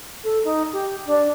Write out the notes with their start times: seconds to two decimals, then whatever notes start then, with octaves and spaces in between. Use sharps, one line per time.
0.24 A4
0.44 D#4
0.73 G4
1.06 D4